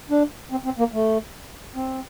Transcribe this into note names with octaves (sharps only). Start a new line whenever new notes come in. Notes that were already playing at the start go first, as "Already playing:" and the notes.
D4
C4
C4
A#3
A3
C4